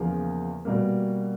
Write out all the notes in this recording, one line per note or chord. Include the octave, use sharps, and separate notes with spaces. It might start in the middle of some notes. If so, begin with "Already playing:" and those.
Already playing: E2 C#3 F3 A#3
B2 G3 A#3